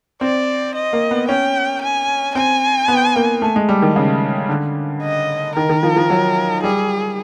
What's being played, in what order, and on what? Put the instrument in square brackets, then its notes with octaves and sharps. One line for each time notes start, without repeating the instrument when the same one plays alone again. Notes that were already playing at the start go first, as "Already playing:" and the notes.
[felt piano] C4 [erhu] D5
[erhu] D#5
[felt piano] A#3
B3
[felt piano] C#4 [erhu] G5
[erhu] G#5
[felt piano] C4 [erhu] G#5
[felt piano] B3
A#3
A3
G#3
G3
D#3
C#3
D3
[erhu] D#5
[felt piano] D#3 [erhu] A#4
[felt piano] D#3
F3
F3
F#3
[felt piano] G3 [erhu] G#4